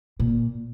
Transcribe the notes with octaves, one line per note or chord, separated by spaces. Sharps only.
A#2